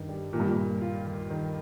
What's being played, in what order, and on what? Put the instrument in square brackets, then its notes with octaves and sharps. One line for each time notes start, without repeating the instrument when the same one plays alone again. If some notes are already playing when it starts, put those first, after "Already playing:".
Already playing: [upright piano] G2 D#3
G3
[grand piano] A#2 [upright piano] D#3
[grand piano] G2
A#2
[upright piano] A#3
F4
D#2
D#3